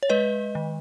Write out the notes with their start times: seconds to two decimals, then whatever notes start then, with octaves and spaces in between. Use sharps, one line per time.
0.03 C#5
0.09 G#3 B4 D#5
0.55 D#3